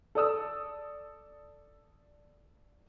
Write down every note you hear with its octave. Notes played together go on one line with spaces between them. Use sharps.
A4 D5 D#6 E6